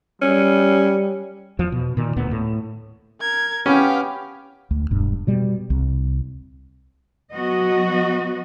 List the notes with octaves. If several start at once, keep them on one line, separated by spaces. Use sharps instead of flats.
G3 C#4
E2 F3
B2
A#2 D#3
D1 D2 A#2 B3
A2
A#4 G#6
B3 C#4 G4 F5 G5
D2
E1 G2
B2 G3
C2
F#3 B3 F#4 D#5